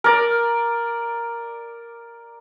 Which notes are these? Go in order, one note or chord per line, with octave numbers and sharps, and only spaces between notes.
A#4 D5